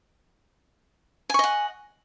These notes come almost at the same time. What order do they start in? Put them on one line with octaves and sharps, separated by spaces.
G#5 C#6 D#5 F#5